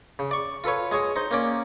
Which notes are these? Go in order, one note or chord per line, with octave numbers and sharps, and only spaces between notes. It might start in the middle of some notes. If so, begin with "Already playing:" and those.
C#3
D5 C#6
F4 A4 B4 C#5
G#3 G#4 C#5
D#4 C5 C6
A#3 C#4 D5